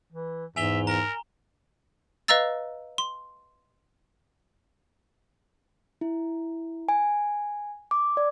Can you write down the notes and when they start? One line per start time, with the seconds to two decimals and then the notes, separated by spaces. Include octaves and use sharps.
0.13 E3
0.56 E2 G#2 E5 G#5 F7 G7
0.87 A#4 A#5
2.28 B4 D#5 F5 A#5 E6 A6
2.98 C6
6.01 E4
6.89 G#5
7.91 D6
8.17 D5